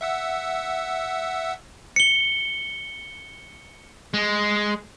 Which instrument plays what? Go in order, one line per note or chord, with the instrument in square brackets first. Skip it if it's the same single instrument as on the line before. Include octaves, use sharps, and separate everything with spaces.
[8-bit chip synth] E5 F#5 E6
[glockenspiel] C#7 G7
[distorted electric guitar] G#3